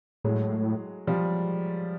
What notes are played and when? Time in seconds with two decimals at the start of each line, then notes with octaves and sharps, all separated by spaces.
0.24 A2 F#3 G#3
1.07 F3 G3